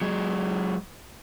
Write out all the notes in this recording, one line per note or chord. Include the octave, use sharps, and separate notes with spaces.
F#3 G#3